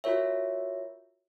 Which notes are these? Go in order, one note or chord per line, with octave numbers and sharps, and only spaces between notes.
F4 F#4 A#4 C#5 E5